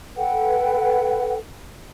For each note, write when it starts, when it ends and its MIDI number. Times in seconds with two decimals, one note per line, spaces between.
0.17 1.36 69
0.17 1.36 71
0.17 1.36 78
0.17 1.36 79